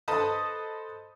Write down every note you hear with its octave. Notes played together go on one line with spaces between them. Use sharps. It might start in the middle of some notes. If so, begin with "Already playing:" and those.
A4 B4 C5 D#5 A5 D#6